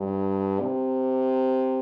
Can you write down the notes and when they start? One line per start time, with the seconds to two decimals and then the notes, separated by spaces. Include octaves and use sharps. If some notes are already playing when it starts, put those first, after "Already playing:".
Already playing: G2
0.61 C3